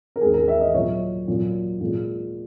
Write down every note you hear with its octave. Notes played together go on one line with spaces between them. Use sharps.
A#4
D#2 C#3 G#3 G#4
A#4
E5
D#5
A#2 F#3 C#5
A#2 F#3
A#2 G#3